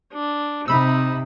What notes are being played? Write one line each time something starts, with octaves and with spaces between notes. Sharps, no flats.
D4
C3 D#4 B5 E6